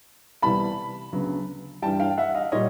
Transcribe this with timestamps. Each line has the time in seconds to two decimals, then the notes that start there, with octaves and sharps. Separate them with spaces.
0.42 C2 C3 E3 G3 B3 A5 B5
1.13 D2 C#3 F#3 B3
1.82 G2 E3 G3 G5 A5
2.00 F5 G5
2.18 E5 F#5
2.35 D#5 F5
2.52 A#2 G3 C#5 D#5